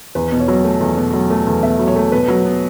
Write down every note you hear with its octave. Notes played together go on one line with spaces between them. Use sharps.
E2 B4
B2
C#5
F#3
A3
E2
B2
F#3
A3
E2
B2 E5
F#3
C#5
A3
B2 B4
F#3
B3